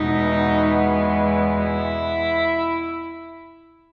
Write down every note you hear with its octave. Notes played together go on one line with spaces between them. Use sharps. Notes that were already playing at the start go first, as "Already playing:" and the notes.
Already playing: E2 B2 G#3 B3 D#4
E4